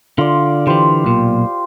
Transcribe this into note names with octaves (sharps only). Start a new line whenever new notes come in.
D3 F4 D5
D3 E3 G4 C5
B1 A#2